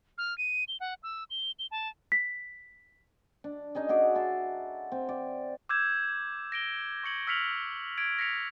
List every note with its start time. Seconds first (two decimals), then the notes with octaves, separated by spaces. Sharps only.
0.18 F6
0.38 D#7
0.68 G7
0.80 F#5
1.03 E6
1.30 G7
1.59 G7
1.71 A5
2.12 B6
3.44 D4
3.75 C#4 D#4 G#4 D#5
3.89 F#4 G#4 A4 D6
4.15 E5 A5 C6
4.92 C4
5.09 D5
5.69 D6 E6 G6 G#6 E7
6.52 A#6 D7 G7
7.03 C#6 G#6 C#7 F#7
7.27 E6 F6 B6 C#7 F7 F#7
7.98 G#6 D7
8.19 A#6 B6 C#7 F7